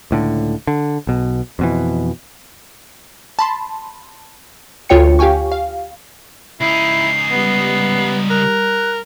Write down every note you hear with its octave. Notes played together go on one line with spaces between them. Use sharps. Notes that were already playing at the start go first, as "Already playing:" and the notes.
C#2 A2 D3
D3
B1 B2
F2 B2 E3
A5 B5 C6
D2 F4 C#5 G5 C#7
G4 F5 G5 G#5 C#6
F5
C#2 D#4 E4 G#5 C7
G3 B3
A#4 F#6